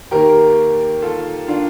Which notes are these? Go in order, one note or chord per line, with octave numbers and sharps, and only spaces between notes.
D#2 D#3 A#3 G4 A#4
F4 A4
D4 F4